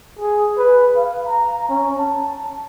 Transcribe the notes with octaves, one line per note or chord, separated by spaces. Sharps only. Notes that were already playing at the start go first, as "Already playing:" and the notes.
G#4
B4
F5
A#5
C#4
A5